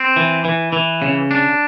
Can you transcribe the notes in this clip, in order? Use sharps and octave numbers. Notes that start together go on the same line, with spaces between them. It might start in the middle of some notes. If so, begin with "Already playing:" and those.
Already playing: C4
E3
E3
E3
C#3
D4